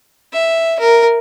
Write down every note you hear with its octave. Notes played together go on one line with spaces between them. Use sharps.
E5
A#4